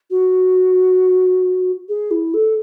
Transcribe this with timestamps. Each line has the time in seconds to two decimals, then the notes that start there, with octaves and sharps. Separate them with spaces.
0.10 F#4
1.89 G#4
2.11 E4
2.34 A4